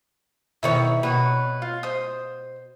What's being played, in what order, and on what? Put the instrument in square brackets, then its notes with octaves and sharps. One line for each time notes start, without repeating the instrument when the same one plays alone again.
[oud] B2 D#3 C#5 [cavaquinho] E4
[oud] B2 [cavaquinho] B4 C#5
[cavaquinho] F4
C5 D#6